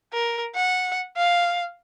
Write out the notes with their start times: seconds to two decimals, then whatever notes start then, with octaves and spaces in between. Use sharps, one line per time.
0.13 A#4
0.55 F#5
1.17 F5